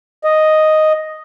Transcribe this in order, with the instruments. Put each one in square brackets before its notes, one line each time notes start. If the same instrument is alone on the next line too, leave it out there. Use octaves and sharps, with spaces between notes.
[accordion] D#5